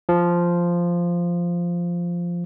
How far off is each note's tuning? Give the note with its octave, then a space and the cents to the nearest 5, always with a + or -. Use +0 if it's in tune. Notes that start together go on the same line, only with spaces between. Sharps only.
F3 -5